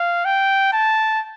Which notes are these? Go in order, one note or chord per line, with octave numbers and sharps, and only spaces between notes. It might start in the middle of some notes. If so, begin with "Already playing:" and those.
Already playing: F5
G5
A5